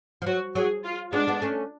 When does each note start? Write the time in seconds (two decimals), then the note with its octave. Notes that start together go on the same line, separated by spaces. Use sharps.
0.22 F3
0.26 F#3 F#4
0.55 F#3 G#4
0.85 F4
1.13 G#3 B3 D4
1.27 G#3 B3
1.42 A3 C#4